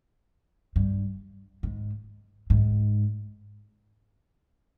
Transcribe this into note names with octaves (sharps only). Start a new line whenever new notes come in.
G2
G#2
G#2